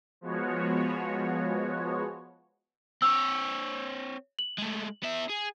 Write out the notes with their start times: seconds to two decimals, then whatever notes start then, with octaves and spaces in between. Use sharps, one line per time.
0.21 F3 G#3 B3 F#4 C#5
3.02 C4 C#5 E6
4.39 F#7
4.58 G#3 A3
5.03 B3 E5
5.30 G#4